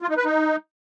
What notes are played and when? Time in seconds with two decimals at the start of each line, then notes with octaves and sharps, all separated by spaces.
0.02 F4
0.09 D#4
0.17 B4
0.25 D#4